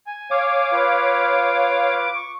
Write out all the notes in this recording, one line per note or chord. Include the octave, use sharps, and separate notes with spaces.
G#5
C#5 F5 D6
F4 B4
C#6